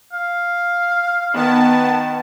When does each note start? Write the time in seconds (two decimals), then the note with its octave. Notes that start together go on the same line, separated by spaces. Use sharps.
0.13 F5
1.33 D#3 B3 A5